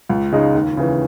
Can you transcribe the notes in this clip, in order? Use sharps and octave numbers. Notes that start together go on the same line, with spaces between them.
C#2
C#3 G#3 D#4
D#2
C#3 E3